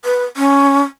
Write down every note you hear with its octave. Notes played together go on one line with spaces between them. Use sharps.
B4
C#4